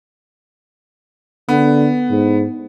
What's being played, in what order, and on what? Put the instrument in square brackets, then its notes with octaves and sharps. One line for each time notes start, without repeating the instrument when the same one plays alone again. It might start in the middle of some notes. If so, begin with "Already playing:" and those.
[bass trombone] D3 [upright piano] B3
[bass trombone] G#2